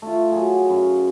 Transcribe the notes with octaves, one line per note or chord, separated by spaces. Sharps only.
A3 F4
F#3 G#4
F#2 F5